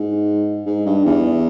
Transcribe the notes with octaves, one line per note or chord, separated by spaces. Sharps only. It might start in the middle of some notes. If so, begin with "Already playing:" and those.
Already playing: G#2
G#2
G2
E2